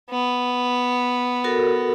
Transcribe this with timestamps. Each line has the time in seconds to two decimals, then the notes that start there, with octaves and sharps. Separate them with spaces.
0.11 B3
1.44 F#4 A4 A#4